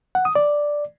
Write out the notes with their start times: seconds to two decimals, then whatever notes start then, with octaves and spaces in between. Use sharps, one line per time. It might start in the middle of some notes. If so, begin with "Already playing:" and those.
0.15 F#5
0.25 D#6
0.35 D5